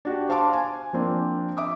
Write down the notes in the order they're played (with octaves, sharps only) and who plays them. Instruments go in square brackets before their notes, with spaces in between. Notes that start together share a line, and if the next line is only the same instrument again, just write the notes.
[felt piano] D4 F#4 G4
C5 F5 A5 C6 D6
G#5
F3 A#3 C4 D4
E5 D6 D#6